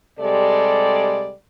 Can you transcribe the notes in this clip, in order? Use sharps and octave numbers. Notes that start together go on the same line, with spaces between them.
C3 G3 G#3 A4 D5